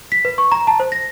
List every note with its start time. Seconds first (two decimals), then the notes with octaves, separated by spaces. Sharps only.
0.12 B6
0.25 B4
0.38 C#6
0.52 A#5
0.67 A5
0.80 C5
0.92 A#6